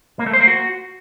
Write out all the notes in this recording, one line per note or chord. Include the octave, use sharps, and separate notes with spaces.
A#3
A3
C5
A#3
F#4